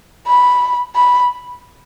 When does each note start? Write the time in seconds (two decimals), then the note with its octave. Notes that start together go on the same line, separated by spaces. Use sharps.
0.27 B5
0.95 B5